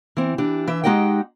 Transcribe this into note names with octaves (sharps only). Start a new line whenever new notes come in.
E3 C4
E3 D4 G4
E3 E5
G#3 D#4 G4 D#5 F#5 G5